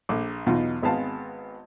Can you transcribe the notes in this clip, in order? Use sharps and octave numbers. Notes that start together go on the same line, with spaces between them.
A#1 A4 D6
B1 E2 B2 D#4 F4
G#1 G#3 B3 C4 F5 A5